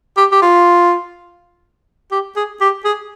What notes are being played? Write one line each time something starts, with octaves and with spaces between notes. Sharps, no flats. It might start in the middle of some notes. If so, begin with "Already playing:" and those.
G4
G4
F4
G4
G#4
G4
G#4